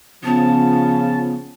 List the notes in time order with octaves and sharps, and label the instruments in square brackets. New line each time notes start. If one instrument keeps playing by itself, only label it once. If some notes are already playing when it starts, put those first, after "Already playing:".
[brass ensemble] C#3 F3 [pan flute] B3 [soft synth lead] A5